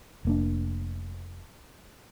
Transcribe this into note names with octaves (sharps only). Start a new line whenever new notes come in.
F1 A#3 D4